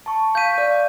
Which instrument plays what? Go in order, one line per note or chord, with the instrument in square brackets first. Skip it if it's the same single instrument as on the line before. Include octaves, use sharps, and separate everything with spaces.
[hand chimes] A5 C#6
[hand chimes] F5 C#6 B6 [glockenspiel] G6 D#7
[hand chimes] D5 F5